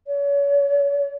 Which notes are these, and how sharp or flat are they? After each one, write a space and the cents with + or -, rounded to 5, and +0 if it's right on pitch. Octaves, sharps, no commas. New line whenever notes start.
C#5 +35